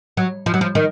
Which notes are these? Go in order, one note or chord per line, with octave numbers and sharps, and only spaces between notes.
F#3
F3
F#3
F3
D#3